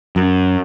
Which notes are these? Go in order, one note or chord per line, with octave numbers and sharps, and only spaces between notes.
F#2